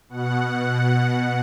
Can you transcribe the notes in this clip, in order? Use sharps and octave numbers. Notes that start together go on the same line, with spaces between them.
B2 F#5